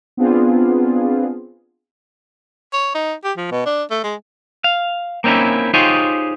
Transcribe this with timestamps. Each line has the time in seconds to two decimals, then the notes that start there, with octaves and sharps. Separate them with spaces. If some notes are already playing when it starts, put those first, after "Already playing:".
0.17 B3 C4 D4 F4 G#4
2.73 C#5
2.95 D#4
3.24 G4
3.37 F3
3.51 B2
3.66 D4
3.90 A3
4.03 G#3
4.64 F5
5.24 A#3 C4 C#4 D#4 E4
5.74 D#4 F4 G4 G#4 C5 C#5